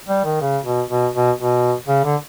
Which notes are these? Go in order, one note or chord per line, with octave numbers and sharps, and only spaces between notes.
G3
D#3
C#3
B2
B2
B2
B2
C#3
D3